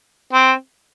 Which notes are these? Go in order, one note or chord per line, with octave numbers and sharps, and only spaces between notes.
C4